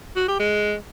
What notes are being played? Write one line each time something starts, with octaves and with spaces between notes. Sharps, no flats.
F#4
G4
G#3